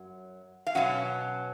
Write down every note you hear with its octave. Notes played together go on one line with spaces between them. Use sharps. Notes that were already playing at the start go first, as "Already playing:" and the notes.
Already playing: F#2 F#3
F5
B2 F#3 C#4 F#5